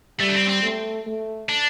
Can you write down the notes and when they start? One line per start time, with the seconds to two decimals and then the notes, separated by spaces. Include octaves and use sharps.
0.20 G3 A3
0.29 D4
0.34 C4
0.49 C4
0.63 A3
1.07 A3
1.49 D4